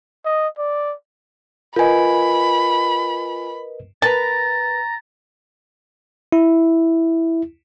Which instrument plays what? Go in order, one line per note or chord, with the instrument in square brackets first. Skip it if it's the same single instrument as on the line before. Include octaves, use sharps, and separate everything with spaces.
[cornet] D#5
D5
[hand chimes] F4 G#5 [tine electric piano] A#4 B4 D#5 [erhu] B5
[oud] A#4 B4 [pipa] A5 [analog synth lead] A#5 [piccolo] A6
[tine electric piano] E4